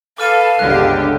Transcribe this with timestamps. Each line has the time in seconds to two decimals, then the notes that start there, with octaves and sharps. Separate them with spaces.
0.18 A4 B4 F5 D6 F6 D#7
0.59 G1 C#2 D3 G4 F#6